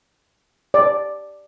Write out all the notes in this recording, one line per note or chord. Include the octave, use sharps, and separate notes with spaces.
D5